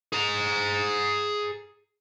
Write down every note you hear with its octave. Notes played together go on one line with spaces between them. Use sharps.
G#4 A#5